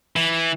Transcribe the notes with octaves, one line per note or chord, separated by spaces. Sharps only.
E3